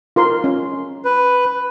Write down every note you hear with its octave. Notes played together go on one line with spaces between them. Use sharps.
F4 A#4 C6
C#4
B4